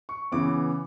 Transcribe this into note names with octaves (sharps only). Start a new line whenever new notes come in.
C#6
C#3 E3 B3 D6